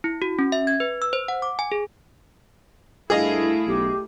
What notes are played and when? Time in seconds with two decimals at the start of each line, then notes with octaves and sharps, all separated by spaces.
0.04 E4
0.22 F#4
0.39 C#4
0.52 E5
0.67 G#6
0.80 B4
1.02 E6
1.13 C5
1.28 F#5
1.42 D6
1.59 G#5
1.72 G#4
3.10 G2 A3 E4 G#4 D#5 F5
3.67 B1 G4